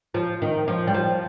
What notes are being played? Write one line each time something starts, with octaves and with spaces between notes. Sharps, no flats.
F3
D#3
F3
G3
F3